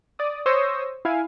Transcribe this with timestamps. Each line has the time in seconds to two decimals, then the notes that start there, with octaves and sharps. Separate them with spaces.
0.19 D5 D#6
0.46 C5 C#5 C#6 D#6 E6 A#6
1.05 E4 F5 G#5